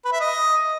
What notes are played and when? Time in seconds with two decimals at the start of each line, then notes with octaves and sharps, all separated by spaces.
0.04 B4
0.12 E5
0.20 D#5